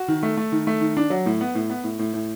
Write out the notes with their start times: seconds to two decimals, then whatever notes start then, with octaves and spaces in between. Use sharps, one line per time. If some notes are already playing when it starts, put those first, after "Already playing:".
Already playing: F#4
0.08 D#3
0.23 A3
0.37 A3
0.52 D#3
0.67 A3
0.81 D#3
0.97 D4
1.10 F#3
1.26 A2
1.41 B3
1.55 A2
1.70 B3
1.84 A2
1.99 A2
2.14 A2